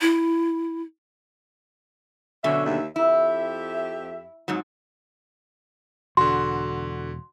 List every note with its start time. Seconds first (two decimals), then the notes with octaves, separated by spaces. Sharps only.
0.01 E4
2.44 F#2 B2 D3 C#4 E5
2.66 D#2 E5
2.96 F2 E4 G4 E5
4.48 F2 G#2 F#3
6.17 E1 D3 F#4 C6